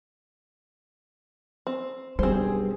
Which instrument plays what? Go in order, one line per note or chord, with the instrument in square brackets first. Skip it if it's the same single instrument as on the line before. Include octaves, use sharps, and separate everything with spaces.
[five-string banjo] C4
[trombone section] B1 G2 G#4 [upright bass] G3 [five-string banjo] C4 C5